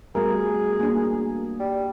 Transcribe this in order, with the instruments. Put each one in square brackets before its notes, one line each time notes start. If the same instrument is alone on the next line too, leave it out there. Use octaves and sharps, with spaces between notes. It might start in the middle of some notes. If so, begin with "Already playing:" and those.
[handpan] G3 [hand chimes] A3 B3 F#4 [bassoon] G#4 [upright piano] A#4
[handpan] A#3 D4
[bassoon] G3